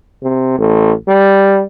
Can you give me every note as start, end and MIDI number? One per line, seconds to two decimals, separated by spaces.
0.23 0.58 48
0.59 0.92 33
1.08 1.63 55